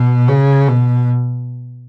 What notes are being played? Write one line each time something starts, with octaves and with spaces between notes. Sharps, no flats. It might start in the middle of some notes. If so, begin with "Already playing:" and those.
Already playing: B2
C#3
B2